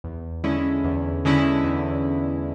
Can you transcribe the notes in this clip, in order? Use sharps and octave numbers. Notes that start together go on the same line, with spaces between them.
E2
D3 G#3 C#4 E4
E2
D3 G#3 C#4 E4
E2